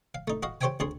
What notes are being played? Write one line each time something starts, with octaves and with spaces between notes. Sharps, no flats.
F5
A3 D#4
F#4 D#5 F5
G4 C5 C#5 E5 G5 G#5
D2 C#4 G#4 C6